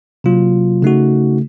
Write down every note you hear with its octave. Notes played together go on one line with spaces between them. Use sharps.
C3 F#3 A#3 F4
C#3 A3 D#4 F#4